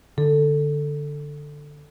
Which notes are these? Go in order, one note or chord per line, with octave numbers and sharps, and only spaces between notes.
D3 A4